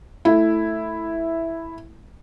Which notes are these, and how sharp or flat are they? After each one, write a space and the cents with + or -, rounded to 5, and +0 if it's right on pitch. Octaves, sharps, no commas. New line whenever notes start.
A3 +0 E4 +0